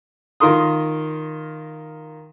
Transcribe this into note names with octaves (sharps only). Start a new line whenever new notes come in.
D#3 F4 A#4 C6 D#6